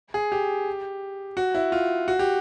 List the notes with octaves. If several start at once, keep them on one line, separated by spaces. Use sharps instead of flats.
G#4
G4
F#4
E4
F4
F#4
G4